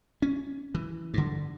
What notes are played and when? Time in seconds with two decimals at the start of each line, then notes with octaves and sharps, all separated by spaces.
0.22 C#4
0.75 E3
1.14 G2 D3